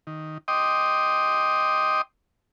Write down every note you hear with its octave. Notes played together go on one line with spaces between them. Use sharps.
D#3
D#5 G5 C6 D6 D#6